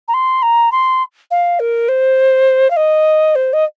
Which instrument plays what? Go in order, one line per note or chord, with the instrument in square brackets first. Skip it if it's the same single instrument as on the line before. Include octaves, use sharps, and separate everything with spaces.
[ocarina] A#5
C6
A#5
C6
F5
A#4
C5
F5
D#5
C5
D#5